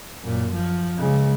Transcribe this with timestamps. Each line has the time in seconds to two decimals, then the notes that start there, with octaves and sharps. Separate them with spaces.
0.23 F#2 A#2
0.54 F3
0.98 C#3 G#3